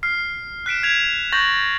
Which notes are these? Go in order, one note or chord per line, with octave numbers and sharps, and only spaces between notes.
F6 C7
F#6 B6 D7 E7
G#6 B6 F7
C#6 G6 A6 A#6 F#7